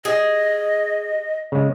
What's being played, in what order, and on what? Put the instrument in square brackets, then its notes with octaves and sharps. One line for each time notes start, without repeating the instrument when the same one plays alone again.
[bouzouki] G#4 [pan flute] D#5
[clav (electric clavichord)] C#3 G#3